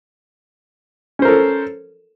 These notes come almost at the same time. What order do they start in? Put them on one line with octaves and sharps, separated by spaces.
C#4 C5 A#4 A4